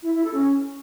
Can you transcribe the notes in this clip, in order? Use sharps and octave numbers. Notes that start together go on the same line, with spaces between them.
E4
E4
A4
C#4